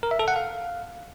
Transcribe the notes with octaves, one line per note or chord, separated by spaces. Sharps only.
A#4
E5
A4
F#5
F5